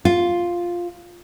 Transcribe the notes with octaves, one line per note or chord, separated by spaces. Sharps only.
F4